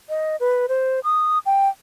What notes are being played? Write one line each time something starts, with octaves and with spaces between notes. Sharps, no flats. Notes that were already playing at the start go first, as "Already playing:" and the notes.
D#5
B4
C5
D#6
G5